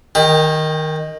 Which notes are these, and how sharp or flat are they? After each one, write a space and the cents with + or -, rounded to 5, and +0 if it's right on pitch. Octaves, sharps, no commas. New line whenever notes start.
D#3 +0 G4 +30